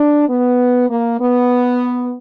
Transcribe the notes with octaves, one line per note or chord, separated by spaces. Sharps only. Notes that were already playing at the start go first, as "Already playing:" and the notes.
Already playing: D4
B3
A#3
B3